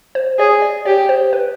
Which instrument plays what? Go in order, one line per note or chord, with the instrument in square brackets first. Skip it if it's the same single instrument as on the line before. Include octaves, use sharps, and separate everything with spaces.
[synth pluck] C5
[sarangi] G#4 [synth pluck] C#5
[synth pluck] D5
[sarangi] G4 [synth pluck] C#5
[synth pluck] C5
B4